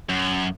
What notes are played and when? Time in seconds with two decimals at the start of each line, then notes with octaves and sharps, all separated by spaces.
0.09 F#2